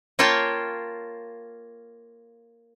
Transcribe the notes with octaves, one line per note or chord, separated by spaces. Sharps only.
A#3 F4 C#5 G5 A5